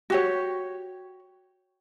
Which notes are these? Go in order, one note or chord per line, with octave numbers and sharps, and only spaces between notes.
F#4 G4 C#5